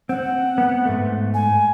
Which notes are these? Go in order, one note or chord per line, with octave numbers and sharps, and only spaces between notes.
C4 F#5
B3
G#2 A3
G#5